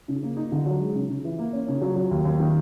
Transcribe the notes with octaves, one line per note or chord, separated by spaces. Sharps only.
C#3
A#3
D#4
D3
F#3
G#3
C#3
C#3
E3
A#3
C#4
C#3
F#3
F#3
D#2
D#2
D#3